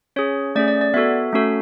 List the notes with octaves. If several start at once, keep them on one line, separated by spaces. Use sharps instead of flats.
C#4 G#4 C#5
A3 C#4 G#4 D5
D5
D5
B3 F#4 A4 E5
A3 C#4 F#4 A4